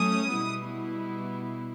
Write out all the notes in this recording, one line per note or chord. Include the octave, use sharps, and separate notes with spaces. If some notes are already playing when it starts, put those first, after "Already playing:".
Already playing: F#3 A3 C#4 D#6
B2 G3 B3 E4